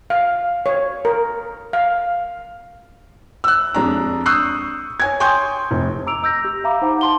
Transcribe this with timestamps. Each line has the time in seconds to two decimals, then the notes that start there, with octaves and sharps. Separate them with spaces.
0.10 F5
0.66 C#5
1.05 A#4
1.73 F5
3.44 E6 F#6
3.74 F2 G#3 D4 A#5
4.26 C#6 D#6 E6 F#6 G6 C7
5.00 C#5 G#5 G#6
5.20 G5 G#5 C6 C#6 D#6 G6
5.71 F1
6.06 A#5 D6 E6 D7 F7
6.23 D#5 E6 G6 A#6
6.45 G4
6.64 E5 F5 A#5 B5 D6
6.82 D#4 C5 F#5 A#5 D6
7.01 A5 C6 G7